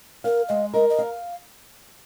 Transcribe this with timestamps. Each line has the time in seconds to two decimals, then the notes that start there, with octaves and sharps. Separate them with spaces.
0.24 A#4 F5
0.49 G#3 D#5
0.74 A#4 D#5
0.90 D#5
0.98 F5